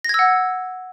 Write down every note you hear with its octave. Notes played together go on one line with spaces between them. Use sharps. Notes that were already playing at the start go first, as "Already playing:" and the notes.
F#5 E6 G#6 A#6